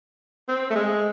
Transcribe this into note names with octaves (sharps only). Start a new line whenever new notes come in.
C4
A3
G#3